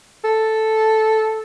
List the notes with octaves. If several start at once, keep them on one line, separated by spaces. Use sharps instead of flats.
A4